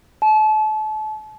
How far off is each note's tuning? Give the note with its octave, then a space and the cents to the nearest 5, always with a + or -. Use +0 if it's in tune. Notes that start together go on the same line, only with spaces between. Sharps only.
A5 -35